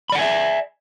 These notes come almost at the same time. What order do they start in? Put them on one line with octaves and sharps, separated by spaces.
B5 D5 F#5 G#5 E5